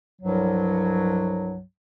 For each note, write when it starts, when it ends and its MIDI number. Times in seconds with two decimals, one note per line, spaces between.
0.22 1.60 36
0.22 1.60 43
0.22 1.60 53
0.22 1.60 54